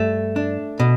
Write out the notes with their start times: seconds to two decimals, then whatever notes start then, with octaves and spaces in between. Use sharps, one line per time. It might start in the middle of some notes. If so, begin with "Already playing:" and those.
Already playing: G2 A3 G4
0.36 D4
0.80 B2